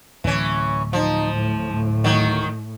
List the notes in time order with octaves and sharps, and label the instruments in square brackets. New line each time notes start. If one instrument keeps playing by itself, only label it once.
[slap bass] D1 [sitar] E3 C#4
[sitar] F3 [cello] D#4
[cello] A2
[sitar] D#3 F#3